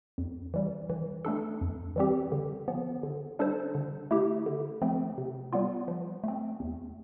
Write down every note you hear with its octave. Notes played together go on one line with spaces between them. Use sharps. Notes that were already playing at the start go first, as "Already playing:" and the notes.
F2
E3 G3
E3
A3 D4 A4
F2
E3 G3 C4 G4
D3
F3 B3
D3
G3 D4 A4 C5
D3
A3 E4 G4
D3
F3 A3 C4
C3
G3 B3 F4
F3
A3 C4
E2